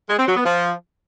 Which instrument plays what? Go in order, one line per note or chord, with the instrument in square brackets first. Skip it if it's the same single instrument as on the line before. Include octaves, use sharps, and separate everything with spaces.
[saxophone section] G#3
C4
F#3
B3
F3